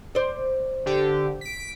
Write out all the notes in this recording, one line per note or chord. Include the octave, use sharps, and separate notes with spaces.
C5 D5
D3 G4
B6 D7